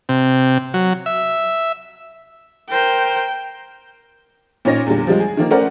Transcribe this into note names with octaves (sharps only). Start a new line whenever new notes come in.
C3
F#3
E5
A#4 C5 G5
A#2 C#4 D#4 C#5 A#6
E2 A#2 D3 G3
F3 G3 G#3
G#4
D#3 F3 A#3
A3 C#4 A#4 C5 D5 F#5